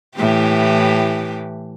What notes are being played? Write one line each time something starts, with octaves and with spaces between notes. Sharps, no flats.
A2 E3 G4